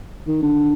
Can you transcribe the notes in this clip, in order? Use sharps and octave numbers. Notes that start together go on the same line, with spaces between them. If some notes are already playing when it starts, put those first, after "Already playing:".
D#3
D3